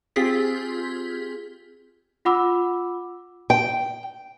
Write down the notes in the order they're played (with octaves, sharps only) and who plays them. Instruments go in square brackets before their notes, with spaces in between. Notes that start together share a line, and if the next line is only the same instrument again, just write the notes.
[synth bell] C4 F4 G4 G#4 B6
[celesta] F4 F#5 B5 D6 E6
[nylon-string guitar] G5